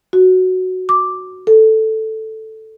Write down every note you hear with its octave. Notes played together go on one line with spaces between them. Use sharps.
F#4
D6
A4